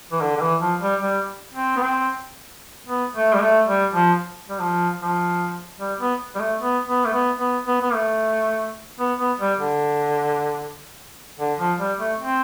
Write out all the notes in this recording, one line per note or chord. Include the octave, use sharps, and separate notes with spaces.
E3
D3
D3
E3
F3
G3
G3
C4
B3
C4
B3
A3
G3
A3
G3
F3
G3
F3
F3
G3
B3
G3
A3
B3
B3
A3
B3
B3
B3
B3
A3
B3
B3
G3
D3
D3
F3
G3
A3
C4